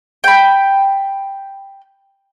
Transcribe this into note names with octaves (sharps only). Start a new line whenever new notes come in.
G5 B5